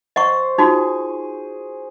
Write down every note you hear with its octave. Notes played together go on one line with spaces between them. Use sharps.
C5 D#5 F#5 C#6
D#4 F4 F#4 G#4 C#6